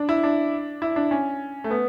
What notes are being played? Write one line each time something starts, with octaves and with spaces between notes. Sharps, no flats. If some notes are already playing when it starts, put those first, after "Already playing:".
Already playing: D4
E4
D4
E4
D4
C#4
A3
B3